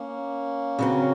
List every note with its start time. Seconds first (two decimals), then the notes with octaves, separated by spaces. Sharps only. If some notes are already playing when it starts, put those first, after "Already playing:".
Already playing: A#3 C#4
0.79 C#3 F#3 C4